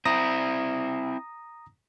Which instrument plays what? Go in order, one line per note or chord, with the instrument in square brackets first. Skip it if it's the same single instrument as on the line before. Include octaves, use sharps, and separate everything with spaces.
[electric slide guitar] C4 E4 [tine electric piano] A#5 D#6 A#6